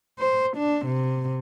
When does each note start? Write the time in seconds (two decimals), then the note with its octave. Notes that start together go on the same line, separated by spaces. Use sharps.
0.19 C5
0.57 D4
0.86 C3